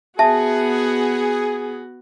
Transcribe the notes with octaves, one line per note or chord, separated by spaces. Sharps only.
B3 F#4 G#4 E5 A5